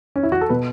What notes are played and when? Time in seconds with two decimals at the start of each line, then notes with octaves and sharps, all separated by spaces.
0.16 C#4
0.23 E4
0.32 F#4
0.41 A4
0.49 B2 B4